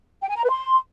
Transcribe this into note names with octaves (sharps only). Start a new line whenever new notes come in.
G5
G#5
A#5
B4
C6